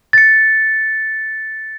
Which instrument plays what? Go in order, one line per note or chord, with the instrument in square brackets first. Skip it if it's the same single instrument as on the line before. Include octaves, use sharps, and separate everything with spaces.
[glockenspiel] A6 C#7